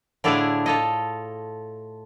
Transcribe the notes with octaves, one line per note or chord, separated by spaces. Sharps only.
A2 D3 D4 E4 G#4 F5
F4 A4 D#5